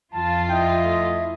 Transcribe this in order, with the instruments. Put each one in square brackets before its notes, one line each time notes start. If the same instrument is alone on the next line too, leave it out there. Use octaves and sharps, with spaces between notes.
[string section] F2 F4 [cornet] A5
[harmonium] E4 [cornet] D#5 [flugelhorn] G5
[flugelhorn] A3